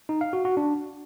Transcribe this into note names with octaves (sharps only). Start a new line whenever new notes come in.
D#4
F5
F#4
F#4
D4